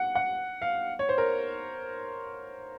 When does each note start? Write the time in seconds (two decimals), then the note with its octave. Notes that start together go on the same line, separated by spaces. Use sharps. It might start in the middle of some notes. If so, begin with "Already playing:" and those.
Already playing: F#5
0.15 F#5
0.62 F5
0.99 C#5
1.09 C5
1.18 A#4